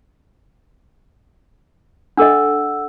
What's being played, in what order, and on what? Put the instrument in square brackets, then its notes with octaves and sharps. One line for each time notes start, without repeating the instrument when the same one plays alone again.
[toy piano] D4 A4 D#5 [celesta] F#5 E6